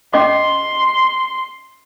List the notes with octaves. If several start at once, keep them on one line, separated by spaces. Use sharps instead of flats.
C#4 D#5 C6 D6